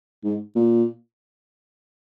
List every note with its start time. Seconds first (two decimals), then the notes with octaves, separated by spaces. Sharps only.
0.24 G#2
0.56 A#2